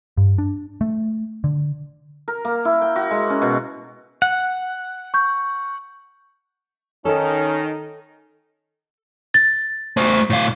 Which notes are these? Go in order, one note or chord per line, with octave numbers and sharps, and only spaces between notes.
G2
D4
A3
D3
A#4
A#3
E4
G5
F#4
G#3
C#4
B2
F#5
C#6 G6
D#3 C#4 D#4 A4
A6
A3 C5
A2 F5